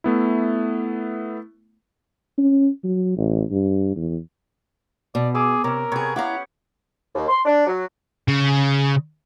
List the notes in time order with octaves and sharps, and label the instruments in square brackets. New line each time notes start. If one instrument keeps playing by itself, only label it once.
[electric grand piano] A3 B3 E4
[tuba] C#4
F#3
A1
G2
E2
[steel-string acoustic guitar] B2 [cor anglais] D5
[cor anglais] G#4 [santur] D6 E6
[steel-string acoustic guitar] C3 [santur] C#4 E6 [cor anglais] A#4
[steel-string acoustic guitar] C3 G#4 [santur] B3 C#5
[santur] C#4 G4 [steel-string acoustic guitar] E4 F5 A#5 [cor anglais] F#5
[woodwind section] D#2
C6
D4
F#3
[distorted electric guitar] C#3